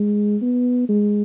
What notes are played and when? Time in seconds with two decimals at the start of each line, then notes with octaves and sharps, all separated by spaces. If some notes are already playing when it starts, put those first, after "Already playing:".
Already playing: G#3
0.42 B3
0.89 G#3